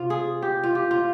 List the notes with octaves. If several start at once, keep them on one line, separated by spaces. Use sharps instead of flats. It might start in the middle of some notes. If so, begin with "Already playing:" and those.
Already playing: C3 F4
G#4
G4
F4
G4
F4